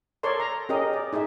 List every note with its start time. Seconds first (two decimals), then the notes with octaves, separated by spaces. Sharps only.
0.23 A4 A#4 C#5 D5 C6
0.40 A#5
0.69 C#4 G4 G#4 A#4 D#5
0.93 D5
1.13 D#4 G#4 A4 E5